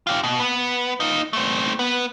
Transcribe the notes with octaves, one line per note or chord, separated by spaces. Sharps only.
F4 G4
B2
B3
D#4 F4
A3 C4
B3